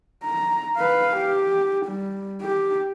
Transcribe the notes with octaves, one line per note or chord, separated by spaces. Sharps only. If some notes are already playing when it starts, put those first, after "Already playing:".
A#5
B4 F5
G4
G3
G4